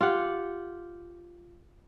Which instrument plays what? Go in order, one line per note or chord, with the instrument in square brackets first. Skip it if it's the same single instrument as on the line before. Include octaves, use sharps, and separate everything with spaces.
[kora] F4 G4 F#5